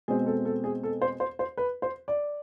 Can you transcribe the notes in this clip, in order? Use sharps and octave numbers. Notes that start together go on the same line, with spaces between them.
B2 G#3 C4 G#4
A4
A4
G#4
A4
C5
C5
C5
B4
C5
D5